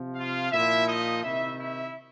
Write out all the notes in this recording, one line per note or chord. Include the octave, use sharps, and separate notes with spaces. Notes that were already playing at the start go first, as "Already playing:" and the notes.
Already playing: C3 F3
F4 F5
A#2 F3 E4 E5
D#4 D#5
C3 D#3 E4 E5
E4 E5